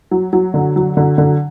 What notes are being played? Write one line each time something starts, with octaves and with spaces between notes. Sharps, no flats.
F#3
F#3
D3
F#3
D3
D3